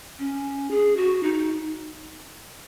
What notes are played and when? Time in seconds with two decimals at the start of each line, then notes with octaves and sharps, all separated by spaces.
0.19 C#4
0.71 G#4
0.97 F#4
1.23 D#4